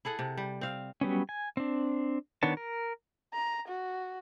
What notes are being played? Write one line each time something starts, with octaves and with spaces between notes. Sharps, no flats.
E4 G#4 A4 F#5
C3
G3
C4 F5
F#3 G3 B3 C#4
G#5
C4 D4
D#3 B3 D4 C#5 A5
A#4
A#5
F#4